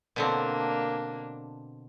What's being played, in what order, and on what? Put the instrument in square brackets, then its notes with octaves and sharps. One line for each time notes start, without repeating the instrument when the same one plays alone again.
[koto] B2 D3 C4 [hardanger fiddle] A#3 D4